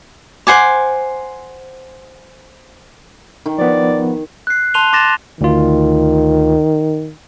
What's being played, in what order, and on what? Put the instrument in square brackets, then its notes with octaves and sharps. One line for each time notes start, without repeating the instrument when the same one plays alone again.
[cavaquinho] C5 F#5 G#5 D6
[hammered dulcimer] D#3
[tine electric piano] F3 B3 [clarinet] D5
[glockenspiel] F#6 C7
A5 C6 F#6 D#7 F7 G7
C6 D6 A6 A#6 E7
[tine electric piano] D2 F4 [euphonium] D#3